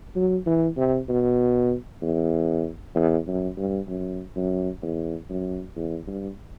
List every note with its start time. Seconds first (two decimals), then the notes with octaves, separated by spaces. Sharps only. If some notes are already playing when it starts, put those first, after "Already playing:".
0.16 F#3
0.46 E3
0.77 C3
1.09 B2
2.02 E2
2.96 E2
3.27 F#2
3.57 G2
3.88 F#2
4.36 F#2
4.83 E2
5.30 F#2
5.76 E2
6.07 G2